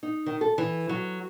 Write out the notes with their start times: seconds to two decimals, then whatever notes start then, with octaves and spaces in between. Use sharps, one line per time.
0.03 D#4
0.26 D#3
0.41 A4
0.58 E3
0.89 F#3